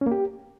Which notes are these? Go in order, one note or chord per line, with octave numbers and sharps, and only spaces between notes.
C#4
A#3
G4